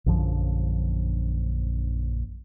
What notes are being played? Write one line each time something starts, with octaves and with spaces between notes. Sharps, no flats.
A#1 F#2 D3 F3